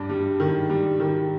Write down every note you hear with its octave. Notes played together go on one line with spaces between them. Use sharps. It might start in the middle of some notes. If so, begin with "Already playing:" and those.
Already playing: G2 D4
G3
D#3
G3
D#3